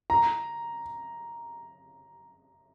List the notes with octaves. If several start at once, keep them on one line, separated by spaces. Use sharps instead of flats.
A#5